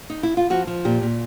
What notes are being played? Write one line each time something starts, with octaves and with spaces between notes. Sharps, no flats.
D#4
E4
F4
F3 F#4
F3
A#2 G4
A#2